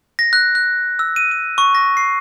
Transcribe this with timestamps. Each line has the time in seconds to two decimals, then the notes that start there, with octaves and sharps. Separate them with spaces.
0.19 A#6
0.33 F#6
0.55 F#6
0.99 E6
1.16 D#7
1.31 D#7
1.58 C#6
1.75 A#6
1.97 C7